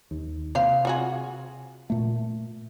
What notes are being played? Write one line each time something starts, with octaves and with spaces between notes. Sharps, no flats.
D#2
C3 A#3 C5 F5
F4 F#4 G#4
A#2 A3